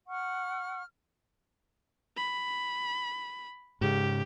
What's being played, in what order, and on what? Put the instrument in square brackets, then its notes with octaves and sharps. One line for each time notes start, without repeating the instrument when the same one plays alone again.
[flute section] F#5 C#6 F6
[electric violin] B5
[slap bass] G#2 C#3 [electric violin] G4